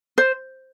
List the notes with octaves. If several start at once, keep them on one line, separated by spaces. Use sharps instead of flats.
C5